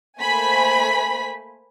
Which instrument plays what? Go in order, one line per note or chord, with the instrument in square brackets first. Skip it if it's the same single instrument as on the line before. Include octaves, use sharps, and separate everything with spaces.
[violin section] A3 A#3 C5 G#5 B5 B6